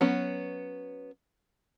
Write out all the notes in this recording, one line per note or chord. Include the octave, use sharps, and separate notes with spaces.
F#3 B3 C#4